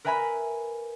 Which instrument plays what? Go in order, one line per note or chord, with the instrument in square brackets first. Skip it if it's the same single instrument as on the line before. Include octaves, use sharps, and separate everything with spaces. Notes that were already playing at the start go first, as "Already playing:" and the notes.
[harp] A#4 B4 E5 G#5 A#5 B5